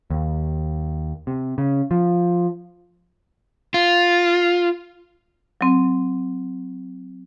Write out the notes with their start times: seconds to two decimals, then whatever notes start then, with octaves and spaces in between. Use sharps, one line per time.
0.10 D#2
1.27 C3
1.58 C#3
1.91 F3
3.74 F4
5.61 F#3 C4